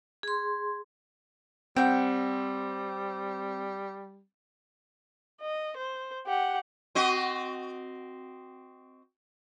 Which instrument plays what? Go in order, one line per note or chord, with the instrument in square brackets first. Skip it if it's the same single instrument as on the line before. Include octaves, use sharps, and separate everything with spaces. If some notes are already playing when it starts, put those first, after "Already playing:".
[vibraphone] G#4 C6
[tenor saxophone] G3 [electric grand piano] C4 [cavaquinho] F#5 G5
[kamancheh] D#5
C5
G4 F#5
[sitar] C4 F#4 D#5